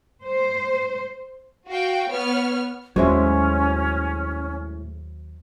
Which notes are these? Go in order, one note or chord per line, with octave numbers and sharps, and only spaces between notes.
C5
F#4 F5 G5
B3 C#5 F6
D#2 A2 F#3 G#3 C#4 C5 C#5 E5